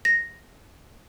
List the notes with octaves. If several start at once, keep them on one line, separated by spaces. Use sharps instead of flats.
A#6